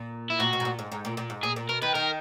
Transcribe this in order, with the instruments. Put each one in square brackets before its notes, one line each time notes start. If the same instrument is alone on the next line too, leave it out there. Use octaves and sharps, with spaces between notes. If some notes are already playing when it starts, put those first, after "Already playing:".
Already playing: [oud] A#2
[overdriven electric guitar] E4
[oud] A#2 [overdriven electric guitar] F#4
[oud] B2
G#2
A#2
G#2
G#2
A#2
A#2
G#2
[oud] A#2 [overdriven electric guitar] G#4
[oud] A#2
[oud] B2 [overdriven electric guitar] A#4
[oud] D#3 [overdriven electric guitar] B4
[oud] D#3 [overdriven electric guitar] A#4